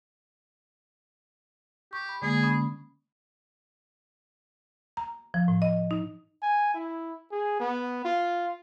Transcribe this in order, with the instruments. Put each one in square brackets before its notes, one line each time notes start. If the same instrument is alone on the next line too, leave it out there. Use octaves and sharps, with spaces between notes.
[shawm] G4 [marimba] C#6
[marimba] B5
[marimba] D3 G#3 A#3 [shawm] G#4
[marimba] C#4 B5 D#6
A#5
F3
A2
D#5
D#4
[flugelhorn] G#5
E4
G#4
B3
F4